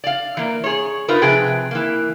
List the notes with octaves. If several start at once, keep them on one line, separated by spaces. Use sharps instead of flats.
D5 F5
E3 A#3
G#4 C#5
D#4 F4 A#4 B4
C3 F3 G#4 B4 G5
E3 A#3